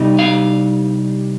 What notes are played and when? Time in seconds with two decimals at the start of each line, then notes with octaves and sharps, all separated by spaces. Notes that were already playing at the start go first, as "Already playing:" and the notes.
Already playing: C3 G3 D#4
0.19 F5